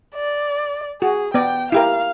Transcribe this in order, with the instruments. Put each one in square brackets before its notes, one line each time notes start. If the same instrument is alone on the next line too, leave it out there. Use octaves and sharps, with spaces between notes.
[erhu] D5
[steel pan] F#4 [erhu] G#4
[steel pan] B3 D5 [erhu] G5
[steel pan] E4 G4 A#4 [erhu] F5